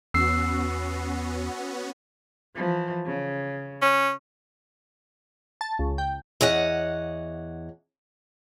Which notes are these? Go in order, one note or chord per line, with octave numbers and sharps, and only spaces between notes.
E2 B3 C#4 F#4 E6 C7
E3 F3
C#3
C#4
A5
C#2
G5
E2 C#5 D#5 F#5